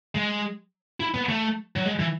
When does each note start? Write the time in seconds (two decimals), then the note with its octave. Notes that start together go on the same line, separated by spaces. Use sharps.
0.15 G#3
1.00 E4
1.14 B3
1.29 A3
1.76 F#3
1.86 G#3
1.99 E3